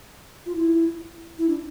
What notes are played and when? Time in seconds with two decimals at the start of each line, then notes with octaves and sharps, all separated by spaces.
0.46 F4
0.55 E4
1.38 E4
1.49 D4